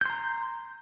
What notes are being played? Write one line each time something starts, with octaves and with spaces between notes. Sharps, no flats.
A#5 C6 G6